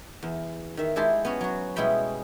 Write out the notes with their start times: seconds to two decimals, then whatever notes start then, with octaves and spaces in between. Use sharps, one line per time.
0.23 E2
0.77 D#3 E5
0.96 G#3 E4 G4 C5 A5 C6
1.25 B3 C#4 F#4
1.41 F#3 F#4
1.76 B2 G3 G#3 E4 G5 B5